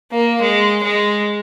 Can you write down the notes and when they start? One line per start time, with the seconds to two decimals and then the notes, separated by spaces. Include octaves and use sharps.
0.12 A#3
0.41 G#3
0.83 G#3